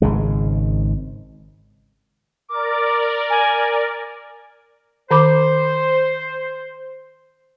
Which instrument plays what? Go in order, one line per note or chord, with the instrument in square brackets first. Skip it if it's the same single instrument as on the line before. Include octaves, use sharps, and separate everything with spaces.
[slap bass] G#1 C#3 G#3
[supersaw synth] A#4 D5 [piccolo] D6
[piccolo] G#5
[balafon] D#3 B5 D6 [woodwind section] C5